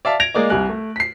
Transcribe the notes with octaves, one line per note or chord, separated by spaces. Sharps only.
D5 E5 F5 A5
G#6 A#6 D7 F7
G#3 A#3 D5 D#5
C2 G3 G#5 F#6
A3
B6 C7